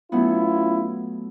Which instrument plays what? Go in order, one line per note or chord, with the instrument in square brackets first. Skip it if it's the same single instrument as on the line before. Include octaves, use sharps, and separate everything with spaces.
[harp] F#3 A3 B3 [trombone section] C#4 E4 F4